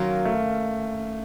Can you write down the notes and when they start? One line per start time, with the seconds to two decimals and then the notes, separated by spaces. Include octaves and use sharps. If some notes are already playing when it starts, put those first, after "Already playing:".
Already playing: D#3 F#3 A#3 C#4 F4
0.25 A3